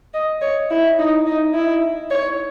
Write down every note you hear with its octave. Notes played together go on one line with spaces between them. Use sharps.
D#5
C#5
E4
D#4
D#4
E4
C#5